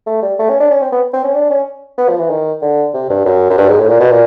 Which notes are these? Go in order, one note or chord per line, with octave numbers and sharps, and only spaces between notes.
A3
G3
A3
C#4
D4
C#4
C4
B3
C4
C#4
D4
C#4
B3
F3
E3
D#3
D3
C3
G2
F#2
F#2
G2
G#2
A2
A#2
B2
A#2